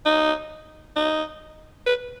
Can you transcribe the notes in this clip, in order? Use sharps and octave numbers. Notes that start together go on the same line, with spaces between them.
D#4
D#4
B4